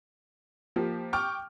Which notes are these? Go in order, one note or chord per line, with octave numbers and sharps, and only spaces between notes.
F3 A#3 G4
G5 C#6 D6 F6